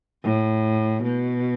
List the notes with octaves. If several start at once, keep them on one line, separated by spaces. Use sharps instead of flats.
A2
B2